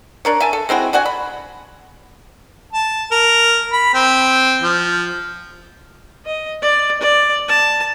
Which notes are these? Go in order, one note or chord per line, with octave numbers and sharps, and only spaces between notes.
D4 A#4 C#5
E5 G#5 A5
A4
G#3 C4 E4 F#4
D4 F#4 F#5 G#5
B5
A5
A#4
B5
C4
F3
D#5
D5
D5
A5